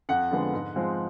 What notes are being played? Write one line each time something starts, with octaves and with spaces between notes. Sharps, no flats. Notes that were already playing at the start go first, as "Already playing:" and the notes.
F2 F#5
D3 F3 G#3 B3
G#2
F3 G#3 C4